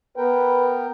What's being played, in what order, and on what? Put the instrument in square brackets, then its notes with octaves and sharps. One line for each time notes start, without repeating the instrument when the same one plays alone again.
[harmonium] B3 A#4 G5 [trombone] B4